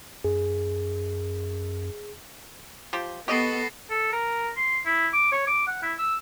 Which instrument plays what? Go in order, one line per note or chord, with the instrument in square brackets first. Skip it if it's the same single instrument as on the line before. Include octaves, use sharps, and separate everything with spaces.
[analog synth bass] F#2 [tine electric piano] G#4
[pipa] F3 G4 C5
[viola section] B3 [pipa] G4 D#5 [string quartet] A4 [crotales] C#6 A#6 C7
[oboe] A4
A#4
C6
E4
D6
C#5
D6
F#5
E4
E6